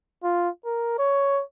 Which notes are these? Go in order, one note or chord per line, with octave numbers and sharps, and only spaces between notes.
F4
A#4
C#5